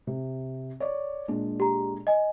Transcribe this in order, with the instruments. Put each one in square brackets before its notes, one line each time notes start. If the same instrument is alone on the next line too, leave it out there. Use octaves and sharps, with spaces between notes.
[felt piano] C3
C#5 D5
A#2 G#3 D4
[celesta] G4 A#5
D#5 G#5